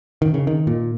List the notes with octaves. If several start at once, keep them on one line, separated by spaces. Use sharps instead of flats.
D#3
C#3
D#3
A#2